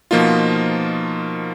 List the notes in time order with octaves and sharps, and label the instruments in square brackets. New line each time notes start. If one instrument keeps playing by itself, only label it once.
[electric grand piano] B2 F3 A#3 D#4 F4